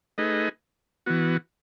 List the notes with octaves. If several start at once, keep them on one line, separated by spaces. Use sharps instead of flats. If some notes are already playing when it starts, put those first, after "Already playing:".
A3 D#4 G#4 B4 D#5
E3 B3 F#4